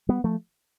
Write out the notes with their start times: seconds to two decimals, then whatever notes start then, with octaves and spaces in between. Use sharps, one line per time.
0.09 G3 B3
0.24 F3 A3